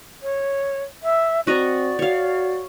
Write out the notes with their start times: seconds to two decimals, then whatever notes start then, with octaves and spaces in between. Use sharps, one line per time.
0.22 C#5
1.03 E5
1.47 C4 F#4 D5 D#5 A#5
1.99 F#4 C#5 F5